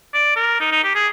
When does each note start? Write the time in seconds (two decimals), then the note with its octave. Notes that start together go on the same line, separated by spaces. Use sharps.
0.14 D5
0.36 A#4
0.60 D#4
0.72 D#4
0.84 G4
0.95 G#4